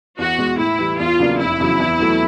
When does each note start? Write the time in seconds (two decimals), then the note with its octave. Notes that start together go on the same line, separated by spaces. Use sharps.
0.18 E2 F#4
0.38 B2 G#3
0.58 A2 E4
0.79 E3 G3
0.99 E2 F4
1.19 C#3 F#3 A#3 D4
1.39 F1 E4
1.59 E2 C#3 F#3
1.80 E2
1.99 B2 F#3 A3